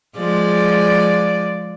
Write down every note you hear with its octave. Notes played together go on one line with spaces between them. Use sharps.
F3 G#3 D5